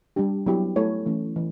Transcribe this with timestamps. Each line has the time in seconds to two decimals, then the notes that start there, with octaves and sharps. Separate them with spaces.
0.16 G3 D4 G4
0.46 F#3 B3 E4 G4
0.76 A3 E4 A4 C#5
1.06 E3 A3 C#4
1.36 E3